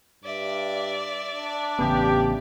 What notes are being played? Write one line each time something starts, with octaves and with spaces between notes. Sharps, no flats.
G2 D5 E5
D4
A1 C#3 B3 G4